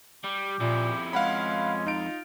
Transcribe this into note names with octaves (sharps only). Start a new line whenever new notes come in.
G3 G4
F2 A#2 E4
G#3 C#4 F5 F#5 B5
D#4 F4 D7